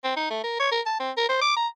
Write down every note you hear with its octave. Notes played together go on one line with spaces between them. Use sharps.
C4
D#4
A3
A#4
C#5
A#4
A5
C4
A#4
C5
D6
A#5